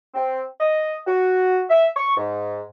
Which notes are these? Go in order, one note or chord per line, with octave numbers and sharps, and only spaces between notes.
C4
D#5
F#4
E5
C#6
G#2